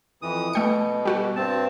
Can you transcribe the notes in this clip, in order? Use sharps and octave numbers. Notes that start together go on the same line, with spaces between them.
F2 E3 D#6
B2 A3 G5 C#7
G3 F#4 G4
G2 C4 A5